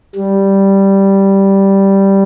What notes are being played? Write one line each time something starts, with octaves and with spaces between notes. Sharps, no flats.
G3